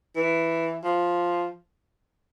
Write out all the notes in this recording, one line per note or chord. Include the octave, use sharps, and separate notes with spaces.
E3
F3